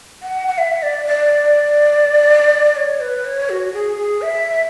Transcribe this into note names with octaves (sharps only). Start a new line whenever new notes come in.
F#5
F#5
E5
D5
D5
C#5
B4
C#5
F#4
G#4
G#4
E5